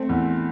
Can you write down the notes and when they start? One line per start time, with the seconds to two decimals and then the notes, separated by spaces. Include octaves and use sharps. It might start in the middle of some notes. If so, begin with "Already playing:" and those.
Already playing: A3 C4
0.09 E2